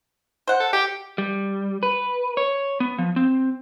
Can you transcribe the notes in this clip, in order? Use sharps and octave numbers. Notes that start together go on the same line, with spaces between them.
C5 F#5
A4
G4 G5
G3
B4
C#5
B3
F3
C4